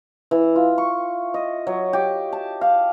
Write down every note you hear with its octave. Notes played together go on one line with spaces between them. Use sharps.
E3
F4
C#6
D#5
F#3
G4
A5
F5